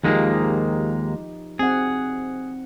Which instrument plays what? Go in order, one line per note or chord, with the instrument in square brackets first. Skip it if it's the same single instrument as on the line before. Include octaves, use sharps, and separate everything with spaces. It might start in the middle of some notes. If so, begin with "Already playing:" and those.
[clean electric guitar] D#2 G#3 A#3 [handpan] F3 D#4 G4
[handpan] C4 F#5 [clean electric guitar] G#4